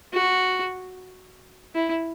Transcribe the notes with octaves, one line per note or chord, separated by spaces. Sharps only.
F#4
E4